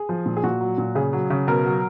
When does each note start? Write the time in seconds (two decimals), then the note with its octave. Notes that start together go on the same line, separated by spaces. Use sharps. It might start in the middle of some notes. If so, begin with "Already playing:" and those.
Already playing: G#4
0.09 F3
0.26 A#2
0.37 G#4
0.44 A#2 F#4
0.61 F#3
0.78 A#2
0.95 C#3 G#4
1.13 F#3
1.30 C#3
1.47 B2 A#4
1.65 F#3